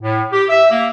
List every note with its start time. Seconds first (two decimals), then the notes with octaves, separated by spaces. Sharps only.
0.02 A2
0.32 G4
0.49 E5
0.70 A#3